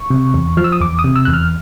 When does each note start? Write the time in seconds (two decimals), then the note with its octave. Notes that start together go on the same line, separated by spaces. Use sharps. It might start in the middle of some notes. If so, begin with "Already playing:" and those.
Already playing: C#6
0.10 C3
0.34 E2
0.57 F3 F6
0.64 E6
0.72 D#6
0.80 E2 D6
0.99 D#6
1.04 C3
1.16 E6
1.25 E2 F#6
1.33 F6